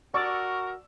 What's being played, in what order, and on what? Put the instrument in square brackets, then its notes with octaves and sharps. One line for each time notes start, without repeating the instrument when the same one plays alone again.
[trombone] F#4 [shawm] A#4 [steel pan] D5 [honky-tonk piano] C#6 E6